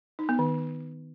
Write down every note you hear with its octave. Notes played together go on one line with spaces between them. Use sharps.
D#4
B3
D#3